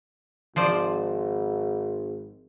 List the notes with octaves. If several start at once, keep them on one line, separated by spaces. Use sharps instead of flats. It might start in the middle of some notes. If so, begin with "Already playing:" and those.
G#1 F3 C5 D5